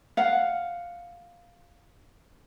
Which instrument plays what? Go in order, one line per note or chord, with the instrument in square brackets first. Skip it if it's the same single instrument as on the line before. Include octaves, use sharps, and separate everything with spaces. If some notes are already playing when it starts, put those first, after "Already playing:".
[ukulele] F5 F#5